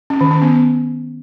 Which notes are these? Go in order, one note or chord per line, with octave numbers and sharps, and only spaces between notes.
C#4
D#3
C#4
B3